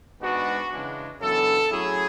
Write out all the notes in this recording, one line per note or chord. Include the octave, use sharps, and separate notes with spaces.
G#2 G#3 B3 D4 F#4
C#3 E3 G#3 D4
F#2 C#3 E3 B3 D4 A4
A2 F#3 C#4 E4 G#4